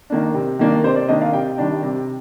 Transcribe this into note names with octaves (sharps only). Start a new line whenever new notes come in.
D#3 A#3 D4
C3
D#3 A#3 D4
C3 C5
D5
D#3 A#3 D4 D#5
F5
C3 G5
D#3 G3 D4
C3